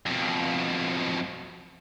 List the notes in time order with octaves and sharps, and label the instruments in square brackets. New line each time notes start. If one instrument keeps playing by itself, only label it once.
[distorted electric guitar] F2 B2